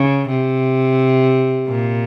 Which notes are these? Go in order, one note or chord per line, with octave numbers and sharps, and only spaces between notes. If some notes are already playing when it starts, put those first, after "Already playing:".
Already playing: C#3
C3
A#2